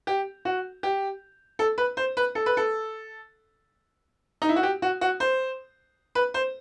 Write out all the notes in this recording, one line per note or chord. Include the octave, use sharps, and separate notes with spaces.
G4
F#4
G4
A4
B4
C5
B4
A4
B4
A4
D#4
E4
F#4
G4
F#4
F#4
C5
B4
C5